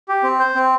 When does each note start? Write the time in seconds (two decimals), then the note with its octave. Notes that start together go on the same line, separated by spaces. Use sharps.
0.09 G4
0.23 C4
0.39 C5
0.55 C4